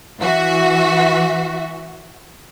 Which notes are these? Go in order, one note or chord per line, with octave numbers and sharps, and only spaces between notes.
E3 F#4 E5